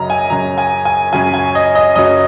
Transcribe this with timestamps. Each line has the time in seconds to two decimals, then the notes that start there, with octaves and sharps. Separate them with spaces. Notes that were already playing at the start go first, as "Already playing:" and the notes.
Already playing: F#2 C#3 F#3 D#5 A#5
0.10 G#5
0.30 F#2 C#3 F#3 A#5
0.58 G#5
0.85 G#5
1.13 F#2 C#3 F#3 G#5
1.34 G#5
1.55 D#5
1.75 D#5
1.96 F#2 C#3 F#3 D#5